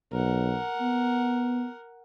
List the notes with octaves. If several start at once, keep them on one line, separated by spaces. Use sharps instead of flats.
B1 A#4 F#5
B3